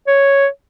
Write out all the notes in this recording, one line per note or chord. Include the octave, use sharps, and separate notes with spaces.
C#5